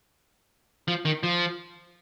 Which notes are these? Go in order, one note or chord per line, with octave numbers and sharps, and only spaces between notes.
F3
D#3
F3